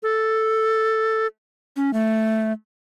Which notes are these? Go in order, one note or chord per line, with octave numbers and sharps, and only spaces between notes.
A4
C#4
A3